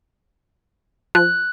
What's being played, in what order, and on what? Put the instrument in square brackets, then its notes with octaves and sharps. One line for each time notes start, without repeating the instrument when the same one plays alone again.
[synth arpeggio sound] F3 [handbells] F#6